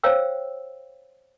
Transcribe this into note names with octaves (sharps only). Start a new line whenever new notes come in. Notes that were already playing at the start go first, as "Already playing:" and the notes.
C5 C#5 F5 G5 E6